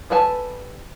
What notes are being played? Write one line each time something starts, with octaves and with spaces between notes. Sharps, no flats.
G3 A4 B4 G#5 A5